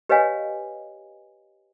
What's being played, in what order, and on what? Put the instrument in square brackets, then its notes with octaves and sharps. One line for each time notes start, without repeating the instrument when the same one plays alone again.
[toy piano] G4 B4 C#5 D#5 F5 G#5